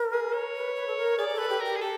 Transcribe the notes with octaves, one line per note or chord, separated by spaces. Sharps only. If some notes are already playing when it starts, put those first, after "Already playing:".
Already playing: A#4
G#4
C#5
B4
B4
A4
A#4
G#4 D5
G#4
A4 B4
G4
A#4
G4
G#4
G4 A4